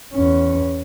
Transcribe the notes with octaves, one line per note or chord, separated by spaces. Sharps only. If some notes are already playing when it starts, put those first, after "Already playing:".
E2 C#4